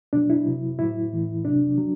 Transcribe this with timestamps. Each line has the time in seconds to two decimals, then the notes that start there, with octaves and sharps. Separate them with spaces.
0.13 B2 F#3 D4
0.30 E4
0.46 C3 F#3
0.79 A2 F#3 E4
1.12 A2 E3
1.45 C3 F#3 D4
1.78 F#3